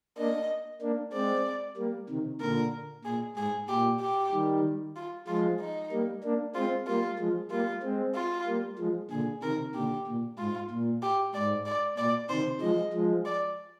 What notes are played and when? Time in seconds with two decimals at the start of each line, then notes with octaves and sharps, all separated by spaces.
0.18 A#3 D4 D#5
0.81 A#3 D4
1.13 G#3 C4 D5
1.77 G3 A#3
2.09 C3 D#3
2.40 A#2 D3 A#4
3.04 A#2 G#4
3.36 G#2 G#4
3.68 A#2 G4
4.01 G4
4.32 D#3 G3
4.96 F4
5.28 F3 G#3 F4
5.60 D#4
5.92 G3 A#3
6.23 A#3 D4
6.55 G#3 C4 F4
6.87 G3 A#3 F4
7.19 F3 G#3
7.51 G3 A#3 F4
7.83 G#3 C4
8.15 F4
8.47 G3 A#3
8.79 F3 G#3
9.10 A#2 D3 G#4
9.43 C3 D#3 A#4
9.74 A#2 D3 G4
10.07 A#2
10.38 G#2 F4
10.70 A#2
11.02 G4
11.34 G#2 D5
11.66 D5
11.97 A#2 D5
12.29 C3 D#3 C5
12.61 F3 G#3 D#5
12.93 F3 G#3
13.25 D5